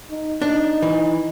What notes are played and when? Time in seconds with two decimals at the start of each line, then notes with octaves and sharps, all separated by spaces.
0.10 D#4
0.42 D4 D#4
0.82 E3